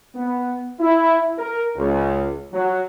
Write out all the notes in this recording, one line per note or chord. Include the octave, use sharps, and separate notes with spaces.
B3
E4
A#4
C#2
F#3